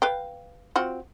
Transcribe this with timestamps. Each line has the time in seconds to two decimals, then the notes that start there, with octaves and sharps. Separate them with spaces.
0.02 B4 F5 G5
0.76 C4 F4 F#4